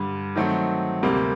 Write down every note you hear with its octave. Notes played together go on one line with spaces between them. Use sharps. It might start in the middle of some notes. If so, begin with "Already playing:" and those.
Already playing: G2 D3 G3
D#3 F#3 A3 C4
D2 C3 G3 A#3